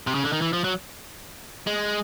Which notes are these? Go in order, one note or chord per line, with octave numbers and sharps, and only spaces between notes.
C3
C#3
D3
D#3
E3
F3
F#3
G#3